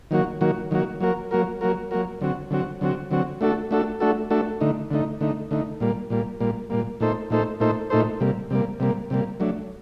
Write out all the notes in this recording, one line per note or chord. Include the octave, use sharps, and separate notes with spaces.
D#3 F#3 A#3 F#4
D#3 F#3 A#3 F#4
D#3 F#3 A#3 F#4
F#3 A#3 F#4 A#4
F#3 A#3 F#4 A#4
F#3 A#3 F#4 A#4
F#3 A#3 F#4 A#4
D3 F#3 C4 F#4
D3 F#3 C4 F#4
D3 F#3 C4 F#4
D3 F#3 C4 F#4
A3 D4 F#4 A4
A3 D4 F#4 A4
A3 D4 F#4 A4
A3 D4 F#4 A4
D3 A3 D#4
D3 A3 D#4
D3 A3 D#4
D3 A3 D#4
A#2 G3 A#3
A#2 G3 A#3
A#2 G3 A#3
A#2 G3 A#3
A#2 A3 D#4 A4 C5
A#2 A3 D#4 A4 C5
A#2 A3 D#4 A4 C5
A#2 A3 D#4 A4 C5
C3 G3 A#3
C3 G3 A#3
C3 G3 A#3
C3 G3 A#3
F#3 A3 D4